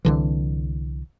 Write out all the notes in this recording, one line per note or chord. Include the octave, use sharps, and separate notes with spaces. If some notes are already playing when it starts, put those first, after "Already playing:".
C2 D3 E3